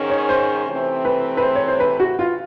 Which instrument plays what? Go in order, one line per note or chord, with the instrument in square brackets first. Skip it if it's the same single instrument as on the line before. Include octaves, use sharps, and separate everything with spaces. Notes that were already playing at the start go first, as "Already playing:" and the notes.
Already playing: [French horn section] G#2 D#3 G#3 C#4
[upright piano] C#5
C5
[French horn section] C3 E3 A3 C4
[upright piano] B4
B4
C5
C#5
C5
B4
F#4
F4